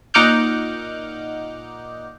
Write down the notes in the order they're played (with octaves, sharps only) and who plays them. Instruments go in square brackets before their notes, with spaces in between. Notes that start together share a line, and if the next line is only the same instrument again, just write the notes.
[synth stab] A#2 D#4 F#5 D6 F6 G6